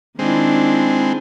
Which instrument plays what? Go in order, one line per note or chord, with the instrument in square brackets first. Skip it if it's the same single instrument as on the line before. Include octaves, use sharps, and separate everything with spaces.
[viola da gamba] D#3 D4 E4 [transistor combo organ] G#3 C4